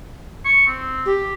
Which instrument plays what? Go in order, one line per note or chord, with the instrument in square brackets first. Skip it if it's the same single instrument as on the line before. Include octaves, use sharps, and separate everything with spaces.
[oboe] C#6
C4
[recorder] G4